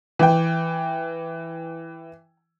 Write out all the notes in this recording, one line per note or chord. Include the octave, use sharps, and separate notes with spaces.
E3 G5